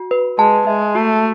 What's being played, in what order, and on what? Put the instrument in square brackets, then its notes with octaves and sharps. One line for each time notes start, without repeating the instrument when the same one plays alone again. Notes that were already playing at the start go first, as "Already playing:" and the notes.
Already playing: [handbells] F#4
B4
[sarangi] G#3 [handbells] A5
[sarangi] G#3 [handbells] E5
[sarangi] A3 [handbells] F#4